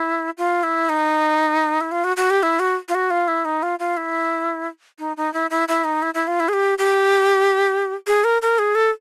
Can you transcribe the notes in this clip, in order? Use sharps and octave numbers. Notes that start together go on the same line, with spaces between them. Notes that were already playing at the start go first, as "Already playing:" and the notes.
Already playing: E4
F4
E4
D#4
E4
F4
F#4
F#4
G4
E4
F#4
F4
F#4
F4
E4
D#4
F4
F4
E4
D#4
D#4
E4
E4
E4
D#4
E4
E4
F4
E4
G#4
G4
G4
G#4
A#4
A#4
G#4
A4